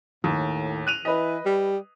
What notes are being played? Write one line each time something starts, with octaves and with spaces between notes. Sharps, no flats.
D#2 A2
F#6 D#7 F7
E3 B4 D#5
G3